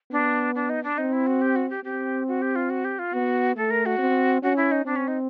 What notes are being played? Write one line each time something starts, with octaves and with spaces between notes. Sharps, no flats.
B3 D4
D4
D#4
D4
C4 D#4
E4
F#4
G4
F#4
G4
C4 G4
F#4
G4
F4
F#4
G4
F4
B3 F#4
A3 A4
A#4
F#4
C4
C#4 F#4
E4
D#4
C4 D4
C#4
D#4